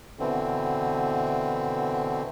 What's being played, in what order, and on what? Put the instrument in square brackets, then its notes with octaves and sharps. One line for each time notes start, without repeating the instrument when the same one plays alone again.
[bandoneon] B2 D3 E3 C4